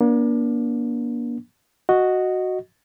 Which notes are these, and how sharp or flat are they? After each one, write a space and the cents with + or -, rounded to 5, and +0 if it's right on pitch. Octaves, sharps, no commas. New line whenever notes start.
A#3 +35 D4 -25
F#4 +0 D#5 +0